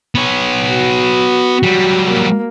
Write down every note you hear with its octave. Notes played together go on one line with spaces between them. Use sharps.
B3 C#5
F#4
F#3 G3
A#3